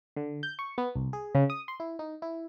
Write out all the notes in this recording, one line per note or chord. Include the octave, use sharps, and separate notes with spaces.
D3
G6
C#6
B3
C2
G#4
C#3
D#6
C6
E4
D#4
E4